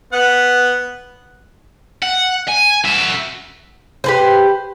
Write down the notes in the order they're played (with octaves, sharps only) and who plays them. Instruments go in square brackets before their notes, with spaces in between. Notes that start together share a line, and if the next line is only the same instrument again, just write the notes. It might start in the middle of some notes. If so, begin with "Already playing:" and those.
[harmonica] B3 F#5
[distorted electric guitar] F#5
G#5
F#4 E5
[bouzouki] G4 B4 C5